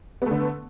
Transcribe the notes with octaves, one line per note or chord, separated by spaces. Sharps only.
D3 A3 B3